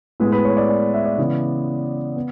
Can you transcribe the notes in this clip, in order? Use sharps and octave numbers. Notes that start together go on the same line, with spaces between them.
A2 G#3 B3 B4
B4
C#5
D5
D5
E5
D5
C#3 E3 B3
B3